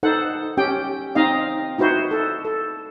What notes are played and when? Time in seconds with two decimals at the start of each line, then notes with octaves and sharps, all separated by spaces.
0.03 D#4 A4 C5 F#5
0.57 C#4 G4 G5
1.15 C4 D#4 D#5 F5
1.78 D#4 E4 F#4 C5
2.11 A4
2.45 A4